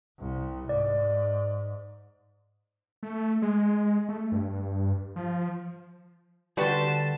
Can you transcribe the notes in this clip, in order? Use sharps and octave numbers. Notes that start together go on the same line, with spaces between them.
C2
G#2 D5
A3
G#3
A3
G2
F3
D3 G3 D4 F#4 B4 A5 C6 E7